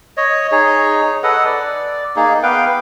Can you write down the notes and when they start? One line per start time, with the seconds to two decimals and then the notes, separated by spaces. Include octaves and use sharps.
0.17 C#5 D#5
0.52 D#4 G#4 C#5
1.23 A4 B4 D#5 F#5
1.46 D5
2.16 A#3 D#4 G#4
2.43 B3 B4 F5 G5